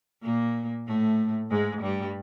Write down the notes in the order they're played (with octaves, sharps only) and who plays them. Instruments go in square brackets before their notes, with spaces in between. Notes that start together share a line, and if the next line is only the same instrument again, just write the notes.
[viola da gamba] A#2 A#3
A2 A3
G#2 G#3
G2 G3